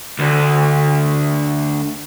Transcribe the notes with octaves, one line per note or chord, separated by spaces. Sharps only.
D2 D3